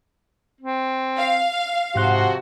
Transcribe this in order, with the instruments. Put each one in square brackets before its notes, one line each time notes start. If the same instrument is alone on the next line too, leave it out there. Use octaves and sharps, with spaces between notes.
[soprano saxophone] C4
[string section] F5
[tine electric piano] G#2 F#6 [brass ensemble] C3 F3 F#4 [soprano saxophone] C6